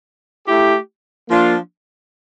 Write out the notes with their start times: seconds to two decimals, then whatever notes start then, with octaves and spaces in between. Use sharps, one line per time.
0.46 A3 E4 G4
1.28 F3 A#3 D4 F4